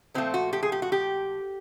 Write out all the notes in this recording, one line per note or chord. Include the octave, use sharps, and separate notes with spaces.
A#2 F3 A3 C4
F#4
G4
G#4
G4
F#4
G4